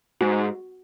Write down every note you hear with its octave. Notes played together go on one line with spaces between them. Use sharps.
G#2 F#4